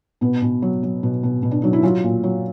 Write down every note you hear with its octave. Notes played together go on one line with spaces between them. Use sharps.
B2 B3
B2
F#3
F#3
B2
B2
B2
D4
F#3 D#4
E4
F#3 F4
A#2
F#3